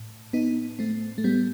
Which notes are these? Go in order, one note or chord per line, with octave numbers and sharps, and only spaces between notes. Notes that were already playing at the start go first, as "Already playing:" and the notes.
Already playing: A2
B3 D#4
A3 C4
A3
G3 B3